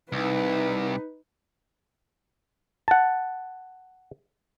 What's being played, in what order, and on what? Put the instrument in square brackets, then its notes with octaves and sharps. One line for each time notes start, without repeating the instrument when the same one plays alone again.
[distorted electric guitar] C2 [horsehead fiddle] D#4 B4
[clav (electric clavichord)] F#5 A5